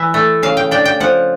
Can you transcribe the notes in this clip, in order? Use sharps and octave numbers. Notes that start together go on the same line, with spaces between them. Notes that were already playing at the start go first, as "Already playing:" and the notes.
Already playing: E3 E5
A3
C#3 F5
G5
D4 G5
G5
F3 F#5